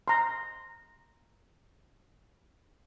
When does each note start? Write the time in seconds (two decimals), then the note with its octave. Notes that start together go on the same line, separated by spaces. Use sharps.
0.08 A#5 C6